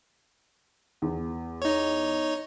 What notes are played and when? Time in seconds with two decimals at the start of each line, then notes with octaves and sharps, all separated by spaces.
1.02 E2
1.62 D#4 C#5